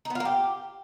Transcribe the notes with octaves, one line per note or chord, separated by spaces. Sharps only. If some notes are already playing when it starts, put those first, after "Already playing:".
D#4
B3
F4
A#3
G4